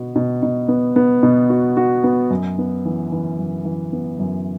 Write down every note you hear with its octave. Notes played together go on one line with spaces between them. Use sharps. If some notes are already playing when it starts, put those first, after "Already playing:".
Already playing: B2 B3 F#4
B2
B2
B3
B3
B2
F#4
F#4
B3
F#2
B3
E3
E3
F#2
E3
B3
F#2